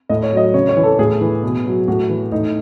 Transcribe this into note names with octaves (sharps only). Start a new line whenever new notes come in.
A2 D#5
C#5
F#3 D#5
C#3 C#5
C#5
E3
A4
A2 G#4
E3
B2
F#3
A2 F#4
E3
A2 D#4